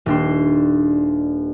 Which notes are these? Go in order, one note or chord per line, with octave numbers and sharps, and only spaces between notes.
D#1 D4 C6